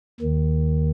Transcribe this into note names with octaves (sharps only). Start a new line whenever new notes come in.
D#2 D#3